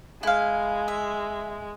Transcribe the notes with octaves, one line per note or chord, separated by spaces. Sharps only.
G#3 E4 F5
E5